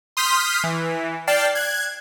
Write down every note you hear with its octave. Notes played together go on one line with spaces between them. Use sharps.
C6 D#6 F6 G6 B6
E3
D5 G5 A5 F6 A6 C7
F#6 G#6